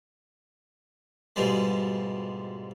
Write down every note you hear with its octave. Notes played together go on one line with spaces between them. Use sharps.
D2 G#2 B2 F3 G3 G#3